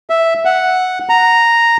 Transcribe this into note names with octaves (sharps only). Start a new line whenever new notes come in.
E5
F#5
A#5